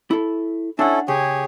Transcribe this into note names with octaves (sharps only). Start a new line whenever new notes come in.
E4 A4
C#4 D4 E4 A4 F#5
C#3 G4 G#4 C#5